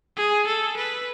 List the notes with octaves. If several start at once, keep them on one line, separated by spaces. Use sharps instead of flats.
G#4
A4
B4